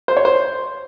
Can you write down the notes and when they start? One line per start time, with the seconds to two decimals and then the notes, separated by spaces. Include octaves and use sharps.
0.08 C5
0.17 C#5
0.25 C5